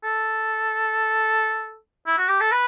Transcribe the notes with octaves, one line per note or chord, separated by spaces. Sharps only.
A4
E4
F#4
G4
A4
B4